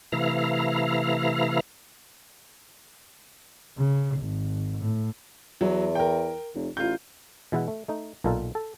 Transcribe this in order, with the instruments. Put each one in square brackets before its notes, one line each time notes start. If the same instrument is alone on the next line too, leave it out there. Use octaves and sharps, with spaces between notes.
[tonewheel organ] C3 E3 A3 E4 F5 A#5
[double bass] C#3
G#1
A2
[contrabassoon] E2 [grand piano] F#3
[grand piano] A#4 G5
[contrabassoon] F1
[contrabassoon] A1 [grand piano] F4 G6
[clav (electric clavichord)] B2 E3 G#3 E4 E5 F#5
A3
A3 D#4
B1 A#2 D#4 F4 A4 A#4
A4